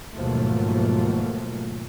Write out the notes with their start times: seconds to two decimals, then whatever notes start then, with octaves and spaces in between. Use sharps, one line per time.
0.16 D#2 G#2 B2 F3 F#3 A3